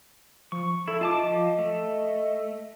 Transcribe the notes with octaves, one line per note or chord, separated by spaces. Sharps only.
F3 C#6
E4 A4
F4 D#5 A5 D6
F3
A3